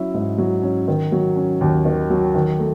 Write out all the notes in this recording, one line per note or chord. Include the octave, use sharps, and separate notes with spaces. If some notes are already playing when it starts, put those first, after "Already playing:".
Already playing: F#3 C#4 E4
G#2
F#3
C#4
D#3
F#3
C#4
D#2
D#3
F#3
D#3
A3